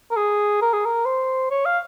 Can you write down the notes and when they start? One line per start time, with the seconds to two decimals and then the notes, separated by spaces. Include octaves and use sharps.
0.11 A#4
0.16 G#4
0.61 A#4
0.73 G#4
0.85 A#4
1.05 C5
1.51 C#5
1.65 F5